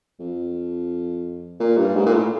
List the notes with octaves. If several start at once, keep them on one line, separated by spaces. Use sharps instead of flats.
F2
A#2
G2
G#2
A#2
A2